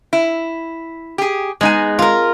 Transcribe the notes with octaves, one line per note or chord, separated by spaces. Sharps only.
E4
G4 G#4
G#3 B3 D#4 G#5
F4 A#4